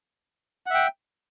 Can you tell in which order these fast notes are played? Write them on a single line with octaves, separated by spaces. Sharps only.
F#5 E5 G5